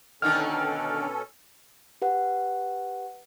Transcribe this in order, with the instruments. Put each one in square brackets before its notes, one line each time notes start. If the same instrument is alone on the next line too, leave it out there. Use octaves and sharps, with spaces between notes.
[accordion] B2 C#4 A4 [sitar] D3 D#3 D4 [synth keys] F6
[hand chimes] G4 B4 F#5